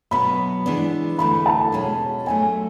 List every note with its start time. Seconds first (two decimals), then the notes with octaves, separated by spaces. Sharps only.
0.11 B2 F#3 B3 B5
0.66 E3 G#3 B3 D4
1.19 E2 D3 A3 B5
1.46 A5
1.72 B2 G#3 C#4
2.26 G#2 F#3 A3 G#5